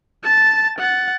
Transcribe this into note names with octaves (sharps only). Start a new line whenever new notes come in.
A5 A6
F#5 A6